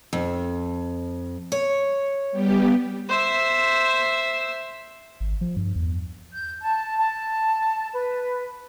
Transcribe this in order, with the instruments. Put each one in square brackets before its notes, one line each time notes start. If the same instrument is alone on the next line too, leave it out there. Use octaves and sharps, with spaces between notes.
[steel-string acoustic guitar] F2
C#5
[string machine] G3 B3 G4
[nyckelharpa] C5 E5
[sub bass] G#1
F3
G2
E2
[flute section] G6
A5
A5
B4